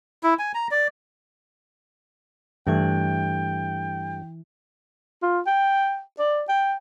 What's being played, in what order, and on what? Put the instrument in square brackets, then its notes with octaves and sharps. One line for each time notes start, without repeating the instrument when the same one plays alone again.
[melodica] E4
G#5
A#5
D5
[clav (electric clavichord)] G2 A3 [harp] E3 F#6 G#6 [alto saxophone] G5
[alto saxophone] F4
G5
D5
G5